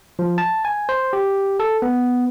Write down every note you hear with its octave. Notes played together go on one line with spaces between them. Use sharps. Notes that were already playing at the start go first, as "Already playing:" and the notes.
F3
A5
G#5
C5
G4
A4
B3